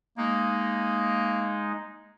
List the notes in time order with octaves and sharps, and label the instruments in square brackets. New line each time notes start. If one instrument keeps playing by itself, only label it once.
[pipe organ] G#3 D#4 [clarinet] A#3